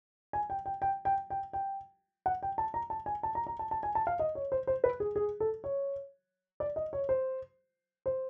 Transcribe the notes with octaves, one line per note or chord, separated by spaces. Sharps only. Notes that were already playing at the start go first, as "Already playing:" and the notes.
G#5
G5
G5
G5
G5
G5
G5
F#5
G5
A5
A#5
A5
G#5
A5
A#5
A#5
A5
A5
G#5
A5
F5
D#5
C#5
C5
C5
B4
G#4
G#4
A4
C#5
D5
D#5
C#5
C5
C5